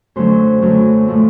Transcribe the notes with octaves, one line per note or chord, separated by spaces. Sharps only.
F#2 D3 F#3 A3 C5
F#2 D3 F#3 A3
A2 F3 A3